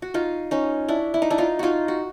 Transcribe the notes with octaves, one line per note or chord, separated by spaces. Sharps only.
F#4
D#4 F4
C#4 D#4
D4 E4
E4
D#4
D4 E4
D#4 F4
D#4 F4 F#4
F#4